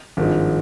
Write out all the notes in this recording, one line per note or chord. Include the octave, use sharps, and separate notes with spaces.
G#1 G2 F3 G#3